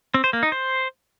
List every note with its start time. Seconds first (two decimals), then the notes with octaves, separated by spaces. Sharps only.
0.14 C4
0.24 C5
0.33 A#3
0.43 D#4
0.52 C5